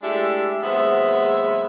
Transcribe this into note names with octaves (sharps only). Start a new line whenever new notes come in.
G#3 A3 D4 E4 G4 E5
D#2 F#3 G#3 B3 C5 E5